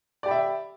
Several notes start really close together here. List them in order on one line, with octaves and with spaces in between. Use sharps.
D5 G4 B5 E5